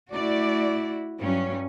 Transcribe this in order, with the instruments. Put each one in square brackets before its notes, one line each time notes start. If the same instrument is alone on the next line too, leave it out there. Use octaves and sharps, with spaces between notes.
[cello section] A3 D5 [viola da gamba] E4 F#4
[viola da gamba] G2 [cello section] F#3 C#4